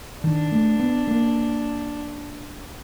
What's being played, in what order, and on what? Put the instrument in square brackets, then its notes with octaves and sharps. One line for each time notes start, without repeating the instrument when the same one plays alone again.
[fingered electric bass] D#3 [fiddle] D4
[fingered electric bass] A3
B3
A#3